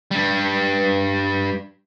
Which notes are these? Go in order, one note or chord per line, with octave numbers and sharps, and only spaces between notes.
G2 G3